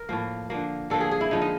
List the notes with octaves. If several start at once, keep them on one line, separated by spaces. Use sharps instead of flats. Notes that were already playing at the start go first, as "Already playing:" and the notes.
Already playing: A#4
A2 F3 A#3
D3 F3 A#3
D3 F3 A#3 A4
G#4
G#4
E4
D3 F3 G#3 D#4
D#4